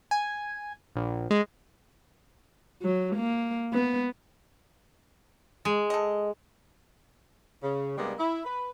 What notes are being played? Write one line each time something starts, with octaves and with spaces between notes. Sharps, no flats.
G#5
A#1
G#3
F#3
A#3
B3
G#3
A4 D#5
C#3
C3 G3 G#3 A#3 B3 D4
E4
B4